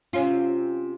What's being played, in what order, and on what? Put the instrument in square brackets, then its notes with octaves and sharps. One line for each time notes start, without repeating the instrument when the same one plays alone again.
[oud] C3 C#4 F4